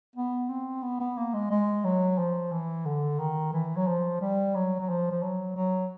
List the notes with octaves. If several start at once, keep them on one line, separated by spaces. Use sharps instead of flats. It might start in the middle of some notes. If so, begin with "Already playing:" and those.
B3
C4
B3
B3
A#3
G#3
G#3
F#3
F3
E3
D3
D#3
E3
F#3
F3
G3
F#3
F#3
F3
F3
F#3
F#3